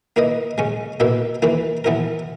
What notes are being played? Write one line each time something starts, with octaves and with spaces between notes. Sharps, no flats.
A#3 E4 B4 D#5
C#3 G#3 C#4
B2 A#3 E4 B4 E5
E3 A#3 E4 B4
E3 B3 E4 A#4